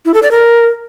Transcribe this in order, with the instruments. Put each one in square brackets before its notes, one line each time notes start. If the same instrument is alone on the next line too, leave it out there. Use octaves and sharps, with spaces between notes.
[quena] E4
A4
D5
A#4